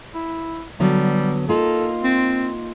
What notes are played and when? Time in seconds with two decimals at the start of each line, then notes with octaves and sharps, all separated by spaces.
0.15 E4
0.80 D3 F#3 G3 B3
1.49 A#3 D#4 F4 A4
2.04 C4